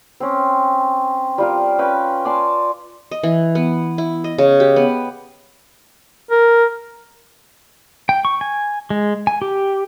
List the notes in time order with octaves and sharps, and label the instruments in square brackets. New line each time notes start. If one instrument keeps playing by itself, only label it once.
[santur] C4 C#4
G3 F4 A#4
C#4 B4 G5 B5
D5 G#5 A5 C6
[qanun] D#5
E3
B3
E4
D#5
C#3
G4
B3
[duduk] A#4
[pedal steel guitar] G5
C#6
G#5
G#3
G#5
G4